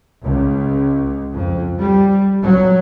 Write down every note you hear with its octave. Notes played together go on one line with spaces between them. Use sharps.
C#2
F2
G3
F#3